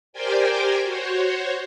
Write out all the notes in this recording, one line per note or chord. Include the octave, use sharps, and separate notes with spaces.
G4 A#4 C5 D5 G5 G#5
F#4 C5 C#5